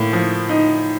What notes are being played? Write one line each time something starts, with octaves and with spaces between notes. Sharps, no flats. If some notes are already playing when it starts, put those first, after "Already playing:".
Already playing: A2 A#3
F3
D#4